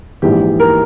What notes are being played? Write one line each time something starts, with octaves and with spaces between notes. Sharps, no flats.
A#1 G#2 E3 G4
A#4